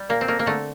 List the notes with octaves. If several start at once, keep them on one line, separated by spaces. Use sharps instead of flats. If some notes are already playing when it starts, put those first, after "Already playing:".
Already playing: G3
A#2 A#3
C4
A3 A#3
A#3
D3 A3